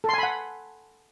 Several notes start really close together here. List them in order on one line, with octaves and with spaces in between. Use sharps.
A4 C6 G#5 B5 F#5